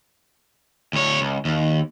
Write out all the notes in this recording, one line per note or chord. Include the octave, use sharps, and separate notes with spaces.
D2 C#5
C#2
D#2